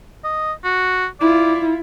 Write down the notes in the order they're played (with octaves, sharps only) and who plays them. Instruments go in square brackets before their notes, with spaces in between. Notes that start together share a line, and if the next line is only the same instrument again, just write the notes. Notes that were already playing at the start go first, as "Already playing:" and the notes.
[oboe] D#5
F#4
[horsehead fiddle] E4 F4 [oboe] D5